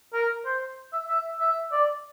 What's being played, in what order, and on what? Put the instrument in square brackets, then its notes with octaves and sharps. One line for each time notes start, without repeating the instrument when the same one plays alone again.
[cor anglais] A#4
C5
E5
E5
E5
D5